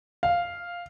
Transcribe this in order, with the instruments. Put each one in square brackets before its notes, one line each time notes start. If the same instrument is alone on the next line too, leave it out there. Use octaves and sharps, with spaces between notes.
[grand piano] F5